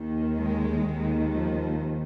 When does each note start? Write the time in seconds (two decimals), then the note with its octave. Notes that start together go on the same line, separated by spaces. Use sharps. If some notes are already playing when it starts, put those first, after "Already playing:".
Already playing: D#2 D#3
0.38 G#3
0.86 D#2 D#3
1.34 F3